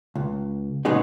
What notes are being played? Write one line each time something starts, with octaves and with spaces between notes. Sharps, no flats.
C#2
A#2 C#3 F#3 G#3 B3 D#4